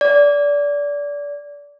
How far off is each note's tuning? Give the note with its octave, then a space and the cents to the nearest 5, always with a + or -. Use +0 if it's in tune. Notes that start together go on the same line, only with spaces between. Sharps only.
D5 -25